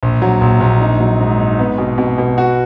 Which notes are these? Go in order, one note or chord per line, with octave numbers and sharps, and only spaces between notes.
A#1
F#3
A#1
A#1
D#4
F#3
G#2
D#4
B3
B2
B2
B2
F#4